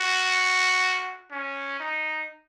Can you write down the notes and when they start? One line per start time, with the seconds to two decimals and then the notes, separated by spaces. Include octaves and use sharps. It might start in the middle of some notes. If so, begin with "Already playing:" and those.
Already playing: F#4
1.32 C#4
1.80 D#4